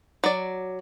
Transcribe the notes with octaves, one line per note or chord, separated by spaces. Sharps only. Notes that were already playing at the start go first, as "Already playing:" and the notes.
F#3 D5